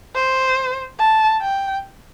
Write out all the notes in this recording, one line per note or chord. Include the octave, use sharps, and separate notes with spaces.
C5
A5
G5